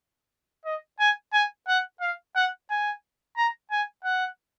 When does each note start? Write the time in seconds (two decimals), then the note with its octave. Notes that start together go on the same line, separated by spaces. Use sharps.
0.65 D#5
1.00 G#5
1.33 G#5
1.68 F#5
2.01 F5
2.36 F#5
2.70 G#5
3.37 A#5
3.71 G#5
4.04 F#5